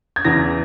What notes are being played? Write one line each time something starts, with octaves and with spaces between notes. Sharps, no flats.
G#6
E2 C#3 E3 A#6